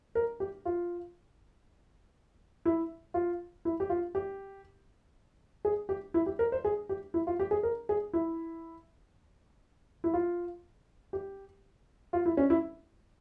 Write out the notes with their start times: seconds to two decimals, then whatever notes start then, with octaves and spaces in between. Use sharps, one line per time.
0.15 A#4
0.40 G4
0.65 F4
2.65 E4
3.14 F4
3.65 E4
3.80 G4
3.90 F4
4.15 G4
5.65 G#4
5.89 G4
6.14 E4
6.26 G4
6.39 A#4
6.52 C5
6.65 G#4
6.89 G4
7.14 E4
7.27 F4
7.40 G4
7.51 G#4
7.63 A#4
7.89 G#4
8.13 E4
10.04 E4
10.14 F4
11.13 G4
12.13 F4
12.26 E4
12.37 C#4
12.50 E4